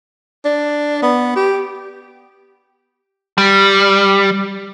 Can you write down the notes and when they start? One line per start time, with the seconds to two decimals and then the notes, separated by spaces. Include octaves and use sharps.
0.45 D4
1.02 B3
1.36 G4
3.38 G3